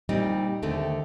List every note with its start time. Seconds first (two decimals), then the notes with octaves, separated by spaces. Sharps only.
0.09 A#2 G3 C4 D#4
0.62 D#2 D3 A3 C4